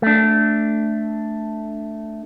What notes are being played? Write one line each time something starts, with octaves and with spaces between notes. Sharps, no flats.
A3 D4